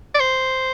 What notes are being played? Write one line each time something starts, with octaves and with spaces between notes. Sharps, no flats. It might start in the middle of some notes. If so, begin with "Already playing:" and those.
D5
C5